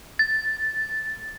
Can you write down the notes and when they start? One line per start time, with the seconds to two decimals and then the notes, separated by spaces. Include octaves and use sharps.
0.19 A6